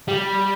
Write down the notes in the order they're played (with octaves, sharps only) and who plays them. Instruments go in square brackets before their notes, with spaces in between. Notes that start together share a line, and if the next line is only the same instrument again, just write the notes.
[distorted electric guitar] G3